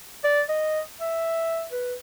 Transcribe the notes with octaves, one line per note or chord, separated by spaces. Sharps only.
D5
D#5
E5
B4